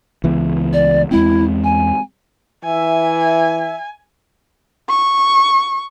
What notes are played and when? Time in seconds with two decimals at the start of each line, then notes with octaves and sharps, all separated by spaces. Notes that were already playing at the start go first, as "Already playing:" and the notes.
0.24 C#2 E3 B3
0.73 D5
1.11 E2 G#3 C4 E4
1.64 G#5
2.64 E3 E5 G#5
4.89 C#6